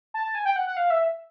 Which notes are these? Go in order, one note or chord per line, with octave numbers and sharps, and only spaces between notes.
A5
G#5
G5
F#5
F#5
F5
E5